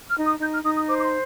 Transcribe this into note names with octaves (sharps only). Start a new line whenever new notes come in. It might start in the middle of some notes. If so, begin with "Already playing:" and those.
F6
D#4
D#6
D#4 G6
F6
D#4 D#6
D#6
C5 D6
D6
C6